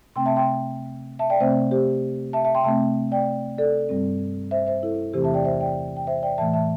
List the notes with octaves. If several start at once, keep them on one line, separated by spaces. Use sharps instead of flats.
C3 A3 C4 G5 C6
E5 A5
G5 C6
E5 A5
D5 G5
C3 A3 C4 C5 E5
G4 C5
E5 A5
E5 A5
G5 C6
C3 A3 C4 E5 A5
D5 G5
A4 D5
G2 G3 C4
C5 E5
C5 E5
E4 A4
E2 C3 E3 A3 C4 G4 C5
E5 A5
D5 G5
C5 E5
D5 G5
G5
C5 E5
D5 G5
A2 E3 A3 E5 A5
E5 A5